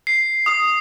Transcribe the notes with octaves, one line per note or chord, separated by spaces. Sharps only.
C7
D#6